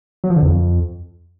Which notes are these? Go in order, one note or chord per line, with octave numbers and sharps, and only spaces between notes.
F#3
F3
D3
E2
F2